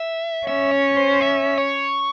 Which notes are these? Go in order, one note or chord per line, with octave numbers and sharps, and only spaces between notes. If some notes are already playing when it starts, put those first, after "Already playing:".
Already playing: E5
C#4 E5
C#5
C5
E5
C#5